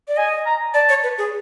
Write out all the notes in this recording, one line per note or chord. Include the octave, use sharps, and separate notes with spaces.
D5
D#5 G#5
A#5
D5 A5
C#5
B4
G#4